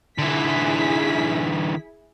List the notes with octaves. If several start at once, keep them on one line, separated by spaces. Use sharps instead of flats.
D3 E3 E4 G#4 B6